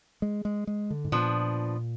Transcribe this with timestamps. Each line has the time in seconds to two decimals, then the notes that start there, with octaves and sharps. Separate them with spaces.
0.22 G#3
0.45 G#3
0.67 G#3
0.90 D3
1.04 G#2
1.12 A#2 F3 B3 D4